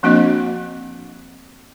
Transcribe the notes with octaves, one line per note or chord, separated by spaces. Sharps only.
F3 A#3 C4 D4 F#4 D#5